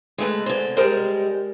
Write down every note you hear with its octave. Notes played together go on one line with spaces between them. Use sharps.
G#3 A3 B4
D3 C5
G3 G#3 A#4 C5